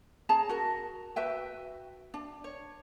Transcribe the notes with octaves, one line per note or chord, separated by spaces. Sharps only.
C#4 G#4 A5 A#5
F#4 A#4
F#4 B4 E5 G5
D4
C#5